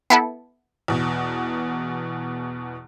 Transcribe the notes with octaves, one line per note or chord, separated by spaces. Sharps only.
B3 E4 A4
E2 B2